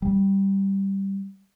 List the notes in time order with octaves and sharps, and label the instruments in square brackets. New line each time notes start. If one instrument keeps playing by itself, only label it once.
[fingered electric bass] G3